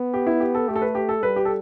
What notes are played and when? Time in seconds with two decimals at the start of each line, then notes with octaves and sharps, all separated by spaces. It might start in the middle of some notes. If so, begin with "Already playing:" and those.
Already playing: B3
0.14 G4
0.27 E4
0.40 G4
0.55 A4
0.68 A3 G4
0.76 A4
0.82 B4
0.95 G4
1.09 A4
1.23 G3 B4
1.36 G4
1.45 A4